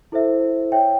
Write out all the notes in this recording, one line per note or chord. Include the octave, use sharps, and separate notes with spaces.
E4 A4 C5 E5
C#5 E5 G5